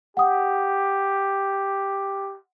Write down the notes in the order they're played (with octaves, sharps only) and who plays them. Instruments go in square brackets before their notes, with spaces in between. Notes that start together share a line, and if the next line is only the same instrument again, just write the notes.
[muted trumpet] G4 [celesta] F#5 D#6